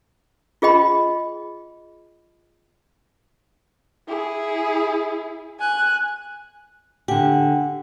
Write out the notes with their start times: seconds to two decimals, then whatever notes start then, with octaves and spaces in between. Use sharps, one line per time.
0.62 F4 G#4 D#5 G5 B5
4.08 E4 G#4
5.60 G#5 F#6
7.08 D3 G4 F#5 G#5